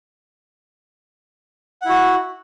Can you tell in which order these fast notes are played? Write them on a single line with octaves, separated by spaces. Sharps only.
F#5 E4 F#4